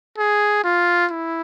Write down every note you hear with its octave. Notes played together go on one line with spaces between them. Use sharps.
G#4
F4
E4